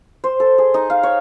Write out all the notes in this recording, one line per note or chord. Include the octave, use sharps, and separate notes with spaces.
C5
A4
G#4
D#4
F5
C#5